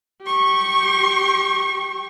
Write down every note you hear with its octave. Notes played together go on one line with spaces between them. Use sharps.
G4 C#6